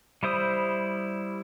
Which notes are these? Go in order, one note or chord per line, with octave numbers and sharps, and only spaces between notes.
G3 E4 C5 D#6